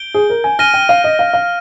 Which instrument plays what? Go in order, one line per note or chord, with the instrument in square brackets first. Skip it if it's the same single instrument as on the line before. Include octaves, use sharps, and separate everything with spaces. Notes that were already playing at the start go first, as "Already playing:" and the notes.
Already playing: [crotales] G6 D7 G7
[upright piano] G#4
A#4
G#5
[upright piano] G#5 [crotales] F6 A#6 D#7 G7
[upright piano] G5
F5
D#5
F5
F5